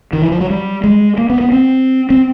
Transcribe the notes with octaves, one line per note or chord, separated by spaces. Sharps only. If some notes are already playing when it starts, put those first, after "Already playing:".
D#3
E3
F3
F#3
G3
G#3
A#3
B3
B3
C4
C4